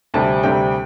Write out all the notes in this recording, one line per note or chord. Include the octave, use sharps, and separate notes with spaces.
D2 C3 G3 C4 A5
D2 C3 G3 C4 G5